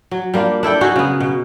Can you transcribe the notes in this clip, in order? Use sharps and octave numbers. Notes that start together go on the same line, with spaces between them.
F#3
G3 A#3 D4 F4
D4 E4 A4 G5
D#4 F#4 G#4
C#3 B3
B2